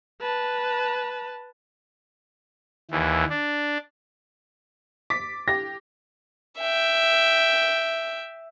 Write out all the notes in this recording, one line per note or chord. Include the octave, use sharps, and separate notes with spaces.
B4 A5
D#2 E3
D4
D6 A6 B6
G4 A#6
E5 G5